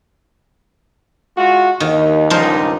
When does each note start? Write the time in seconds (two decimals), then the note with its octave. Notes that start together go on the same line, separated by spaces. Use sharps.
1.37 G#3 F4 F#4
1.80 D#2 D#3
2.30 C#2 G2 F3 D#4 A#4 C5